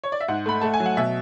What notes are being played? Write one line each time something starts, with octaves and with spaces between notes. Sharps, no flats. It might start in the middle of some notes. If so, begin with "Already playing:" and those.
C#5
D5
E5
G#2 F#5
A3 B5
A3 A5
G#5
F#3
F#5
B2 E5